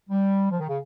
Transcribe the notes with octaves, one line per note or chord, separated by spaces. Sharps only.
G3
F3
D#3
C#3